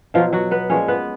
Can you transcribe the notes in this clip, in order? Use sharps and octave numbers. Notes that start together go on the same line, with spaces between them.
B2 F3 F#3 F4
F#3 F#4
B3 B4
A#2 F3 G#3 C#4 C#5
B3 B4